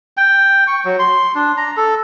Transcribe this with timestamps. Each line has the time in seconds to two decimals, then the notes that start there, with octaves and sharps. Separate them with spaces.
0.17 G5
0.67 C#6
0.85 F#3
0.99 C6
1.35 D4
1.57 A#5
1.77 A4